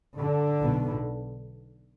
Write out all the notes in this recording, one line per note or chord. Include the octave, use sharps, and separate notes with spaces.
D3
B1 B2